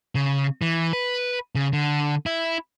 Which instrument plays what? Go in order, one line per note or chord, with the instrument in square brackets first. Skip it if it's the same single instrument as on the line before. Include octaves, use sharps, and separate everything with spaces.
[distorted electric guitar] C#3
E3
B4
C#3
D3
E4